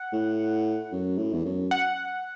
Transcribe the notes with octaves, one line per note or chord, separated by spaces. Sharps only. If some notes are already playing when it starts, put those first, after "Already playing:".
Already playing: F#5
A2
F#2
A2
E2
F#2
F#5